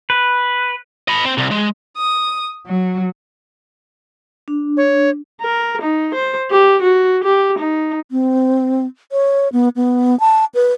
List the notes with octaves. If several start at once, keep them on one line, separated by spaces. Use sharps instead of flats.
B4
D#5 B5
C4
C2
G#3
D#6
F#3
D4
C#5
A#4
D#4
C5
G4
F#4
G4
D#4
C4
C#5
B3
B3
A5
B4